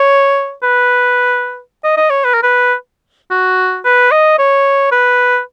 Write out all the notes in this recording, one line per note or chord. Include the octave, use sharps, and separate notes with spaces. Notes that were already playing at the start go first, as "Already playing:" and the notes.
Already playing: C#5
B4
D#5
D#5
C#5
B4
A#4
B4
F#4
B4
D#5
C#5
B4